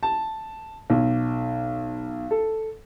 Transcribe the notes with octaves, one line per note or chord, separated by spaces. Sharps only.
A5
B1
A4